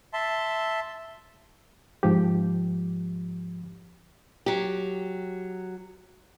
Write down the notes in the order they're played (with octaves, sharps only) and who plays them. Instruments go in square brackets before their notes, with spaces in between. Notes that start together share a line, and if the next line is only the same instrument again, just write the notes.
[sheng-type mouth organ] E5 A5 C6
[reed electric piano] G#2 F3 G4
[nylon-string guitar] F#3 G4